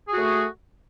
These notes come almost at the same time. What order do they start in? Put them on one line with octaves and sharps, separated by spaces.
G#4 F#4 A3